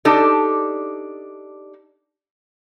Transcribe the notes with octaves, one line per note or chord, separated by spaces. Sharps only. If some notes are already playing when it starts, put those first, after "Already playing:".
D4 D#4 G4 A4 D5